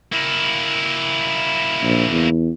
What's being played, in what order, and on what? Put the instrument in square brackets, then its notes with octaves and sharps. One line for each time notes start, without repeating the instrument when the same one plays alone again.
[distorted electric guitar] A#3 E4
[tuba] A#1
E2